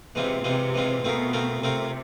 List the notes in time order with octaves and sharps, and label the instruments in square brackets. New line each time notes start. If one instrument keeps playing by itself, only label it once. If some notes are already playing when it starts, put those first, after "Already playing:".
[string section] C3 [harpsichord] E3 G#3 C4 F4
[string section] C3 [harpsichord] E3 G#3 C4 F4
[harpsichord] E3 G#3 C4 F4
[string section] B2 [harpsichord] A3 C4 F4 A#4
[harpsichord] A3 C4 F4 A#4
[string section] C3 [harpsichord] A3 C4 F4 A#4